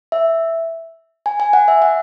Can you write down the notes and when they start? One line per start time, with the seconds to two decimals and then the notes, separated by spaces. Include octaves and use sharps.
0.12 E5
1.26 G#5
1.40 G#5
1.53 F#5
1.68 E5
1.82 F#5